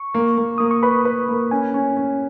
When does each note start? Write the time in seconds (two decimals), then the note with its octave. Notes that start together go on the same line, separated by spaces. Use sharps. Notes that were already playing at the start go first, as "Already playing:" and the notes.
Already playing: C#6
0.15 A#3
0.38 A#3
0.58 A#3 D#6
0.71 C#6
0.83 B4 B5
1.05 B4
1.29 A#3
1.51 C#4 G#5
1.74 C#4
1.97 C#4